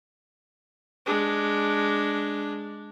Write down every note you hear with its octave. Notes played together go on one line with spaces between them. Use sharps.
G#3 D4